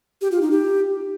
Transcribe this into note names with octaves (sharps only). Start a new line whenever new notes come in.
G4
F4
D#4
G4